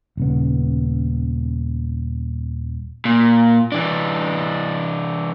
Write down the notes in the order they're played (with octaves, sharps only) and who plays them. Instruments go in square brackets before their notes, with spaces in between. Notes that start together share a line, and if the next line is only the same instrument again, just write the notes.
[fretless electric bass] D#1 C#3 B3
[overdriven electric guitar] A#2
E3 D4